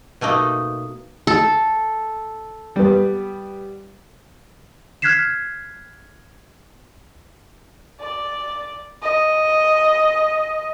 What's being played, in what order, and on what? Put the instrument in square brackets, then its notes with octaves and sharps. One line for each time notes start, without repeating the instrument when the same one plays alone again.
[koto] B2 A3 A#3 D#4
[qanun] A4
[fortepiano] G3 B3
[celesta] F6 F#6 G#6 B6 C7 E7
[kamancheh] D5
D#5